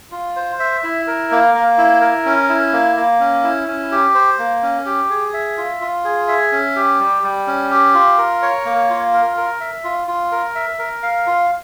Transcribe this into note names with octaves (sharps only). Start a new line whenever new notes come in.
F4
C5
E5
E4
A#4
A#3
A#3
E4
A#4
C#4
E4
A#3
A#3
C#4
E4
C#4
G4
C5
A#3
C#4
G4
G#4
E5
F4
F4
G#4
E5
C#4
G4
G3
G3
C#4
G4
F4
A#4
C#5
A#3
F4
A#4
A#4
E5
F4
F4
A#4
E5
A#4
F5
F4